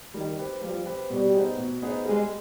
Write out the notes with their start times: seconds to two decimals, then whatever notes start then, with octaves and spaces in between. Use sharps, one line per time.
0.14 D#3 G3
0.39 C4 G4 B4
0.62 F3 G3
0.86 C4 G4 B4
1.10 B2 G3
1.34 B3 D#4 G#4 C5
1.57 B2
1.82 B3 D#4 G#4 C5
2.05 G3 G#3